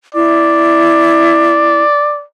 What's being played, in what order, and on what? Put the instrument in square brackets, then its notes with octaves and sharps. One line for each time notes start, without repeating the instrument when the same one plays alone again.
[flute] E4 [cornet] D5